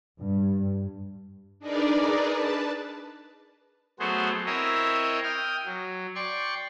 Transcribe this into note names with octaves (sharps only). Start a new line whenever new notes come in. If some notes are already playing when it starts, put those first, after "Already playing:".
G2
D4 D#4 G#4 A#4 B4 D5
B4 A5
F#3 A3 B3 F#4 G#4 C5
C4 E4 A#4 C#5 D#5 E5
G5 D#6 F6
F#3
D5 G5 C6 C#6